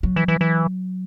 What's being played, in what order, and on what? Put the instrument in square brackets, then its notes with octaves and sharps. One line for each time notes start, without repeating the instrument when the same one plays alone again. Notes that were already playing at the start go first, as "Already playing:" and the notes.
[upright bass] F#3
[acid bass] E3
E3
E3